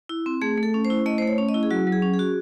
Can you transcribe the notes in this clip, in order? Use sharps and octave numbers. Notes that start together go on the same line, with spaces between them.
E4
C4
A3 G#4
A3
A4
C#4
C5
E4
A3 D#5
A3 C5
C#5
C#4
D#5
E4
G#4
F#3 F#4
F#3
G#4
C#4
G#4
F#4